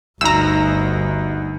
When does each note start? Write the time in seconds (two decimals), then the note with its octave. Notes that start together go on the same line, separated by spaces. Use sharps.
0.21 G1 D2 D#4 A#5 E6